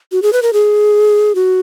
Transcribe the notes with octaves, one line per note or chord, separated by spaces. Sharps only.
F#4
G#4
B4
A#4
G#4
F#4